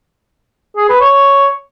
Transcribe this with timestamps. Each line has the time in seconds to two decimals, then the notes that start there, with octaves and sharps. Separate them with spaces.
0.76 G#4
0.89 B4
1.00 C#5